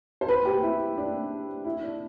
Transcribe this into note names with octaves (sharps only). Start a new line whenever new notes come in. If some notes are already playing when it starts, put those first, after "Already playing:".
C5
B4
G4
E4
D4
E4
D4